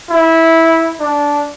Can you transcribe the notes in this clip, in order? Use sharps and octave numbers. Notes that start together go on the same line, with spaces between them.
E4
D4